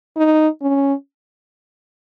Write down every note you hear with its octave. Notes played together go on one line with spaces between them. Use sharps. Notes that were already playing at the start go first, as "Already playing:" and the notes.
D#4
C#4